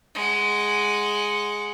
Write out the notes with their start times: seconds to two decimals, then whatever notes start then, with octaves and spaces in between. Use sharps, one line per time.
0.15 G#3 F#5